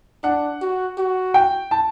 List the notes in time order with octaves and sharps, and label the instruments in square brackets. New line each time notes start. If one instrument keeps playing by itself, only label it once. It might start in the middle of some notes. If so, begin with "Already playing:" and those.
[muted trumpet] D4 [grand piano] F#5
[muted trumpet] F#4
F#4
[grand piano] G5
A5